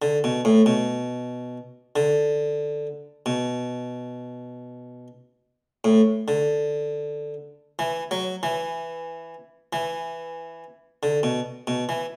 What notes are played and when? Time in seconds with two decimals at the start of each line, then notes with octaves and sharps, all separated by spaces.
0.02 D3
0.24 B2
0.45 A2
0.66 B2
1.96 D3
3.26 B2
5.84 A2
6.28 D3
7.79 E3
8.11 F#3
8.43 E3
9.73 E3
11.03 D3
11.23 B2
11.67 B2
11.89 E3